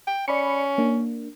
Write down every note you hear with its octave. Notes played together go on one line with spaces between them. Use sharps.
G5
C#4 D5 B5 C#7
A#3 D4